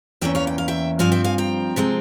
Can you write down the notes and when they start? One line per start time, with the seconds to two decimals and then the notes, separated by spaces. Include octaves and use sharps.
0.21 E2 E3 A#3 C#4 E5 G5
0.35 C#5 F5
0.47 G5
0.58 F5
0.68 E5 G5
0.99 G2 F3 C4 F5 G#5
1.12 E5 G5
1.24 F5 G#5
1.38 G5 A#5
1.76 C3 F3 G#3 C4